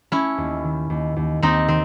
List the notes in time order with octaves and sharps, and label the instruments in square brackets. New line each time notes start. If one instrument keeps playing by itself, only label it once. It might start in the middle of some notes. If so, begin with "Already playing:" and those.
[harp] A3 [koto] C#4 E4
[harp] D#2
D#3
D#2
D#2
[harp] D#2 [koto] C4 D#4
[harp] D#3 [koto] C4